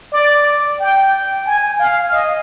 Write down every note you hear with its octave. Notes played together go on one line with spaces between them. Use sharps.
D5
G5
G#5
F5
D#5